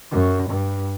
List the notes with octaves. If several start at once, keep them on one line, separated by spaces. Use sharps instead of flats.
F#2
G2